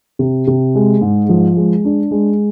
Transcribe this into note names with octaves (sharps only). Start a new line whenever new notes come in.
C3
C3
G#3
G#2
F3
G#3
D4
G#3